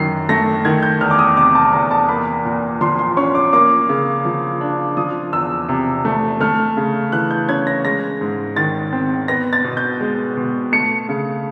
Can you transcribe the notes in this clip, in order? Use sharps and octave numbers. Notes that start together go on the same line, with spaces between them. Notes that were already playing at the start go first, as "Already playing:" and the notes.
Already playing: F#2 D#3 F#3 C7
A3 A#6
D#3 G#6
G6
E2 F6
D6
D#6
C3 D6
A5
E2 A#5
A5
A#3 B5
A#2
F3 C6
C6
C#4 C#6
D6
A#3 D6
C#3
F3
D4
F3 D#6
E2 E6
C3
A3
A3 F6
C#3
E3 F#6
G6
C#4 G#6
A#6
G#3 A#6
G#2
D#3 A6
C4
B3 A#6
A6
B2
G6
G#3
B2
A3 C#7
C#3